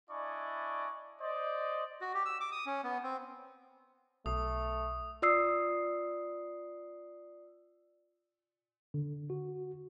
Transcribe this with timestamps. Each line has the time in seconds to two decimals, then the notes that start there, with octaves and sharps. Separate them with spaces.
0.10 D4 E4 D5 D#5 G#5 C#6
1.21 C5 D5 D#5
2.01 F#4
2.14 G4
2.25 E6
2.40 D6
2.52 D#6
2.66 C#4
2.84 B3
3.03 C4
4.26 B1 A3 D#6
5.22 F4 D5 D#6 E6 C7
8.94 D3
9.30 F#4